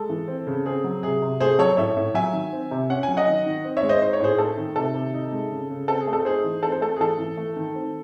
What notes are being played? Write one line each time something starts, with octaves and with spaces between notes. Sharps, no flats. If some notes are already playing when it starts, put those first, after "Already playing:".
Already playing: G#3 A4
E3
C4
C#3
C4 G#4
F#3
C3 G#4
C3
A3 G#4 C5
F#3 A4 C#5
A2 C#5 E5
A2
F#3 E5 G#5
D#3
C4
C3
C#4 F#5
G#5
F#3
D#5 F#5
D#3
D#3
C4
C#5 E5
G#3
C5 D#5
D#4 C5
C#5
A2 G#4 C5
A3 A4
D#3
C3 A4
C3
D#4
G#3
C#3
C#3
C4 A4
G#4
A3
A4
D#4 G#4 C5
E3
C4 A4
C5
A3 A4
G#4
E3 A4
E3
A3
D#3
C4